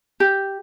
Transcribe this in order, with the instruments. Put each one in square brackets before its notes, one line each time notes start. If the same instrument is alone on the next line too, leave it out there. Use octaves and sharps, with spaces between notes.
[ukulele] G4